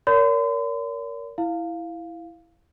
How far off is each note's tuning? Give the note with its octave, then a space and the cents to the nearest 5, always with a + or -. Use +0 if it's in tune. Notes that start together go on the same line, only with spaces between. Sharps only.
A#4 +0 C#5 +45 C6 -45
E4 +0 F5 +0